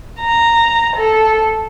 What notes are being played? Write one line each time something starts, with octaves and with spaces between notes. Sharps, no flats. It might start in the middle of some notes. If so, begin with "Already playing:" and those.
A#5
A4